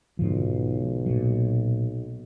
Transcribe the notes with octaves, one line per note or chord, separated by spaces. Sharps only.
B1 G#2 D3 F3
A#2 F#3